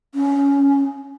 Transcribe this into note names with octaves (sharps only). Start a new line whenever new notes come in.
C#4